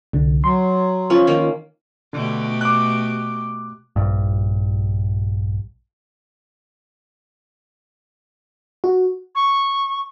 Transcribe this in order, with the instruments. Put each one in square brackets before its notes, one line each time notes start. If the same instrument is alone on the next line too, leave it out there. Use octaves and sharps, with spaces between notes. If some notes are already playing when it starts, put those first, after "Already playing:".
[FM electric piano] C2 D3
[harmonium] F#3 [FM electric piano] C6
[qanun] F3 C#4
D#3 A#3
[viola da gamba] B2 A3 G4 [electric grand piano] D3
[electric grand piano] D6 F#6
[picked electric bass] A#1 G2
[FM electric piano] F#4
[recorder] C#6